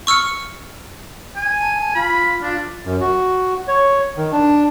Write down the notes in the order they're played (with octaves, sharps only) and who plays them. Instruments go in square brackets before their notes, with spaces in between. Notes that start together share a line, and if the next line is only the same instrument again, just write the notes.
[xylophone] C#6 E6 F6 C#7
[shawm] G#5
[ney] A5
A5
[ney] F4 [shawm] B5
[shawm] D4
[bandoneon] F#2
F#4
C#5
D#3
D4